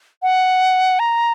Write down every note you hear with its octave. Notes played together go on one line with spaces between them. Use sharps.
F#5
A#5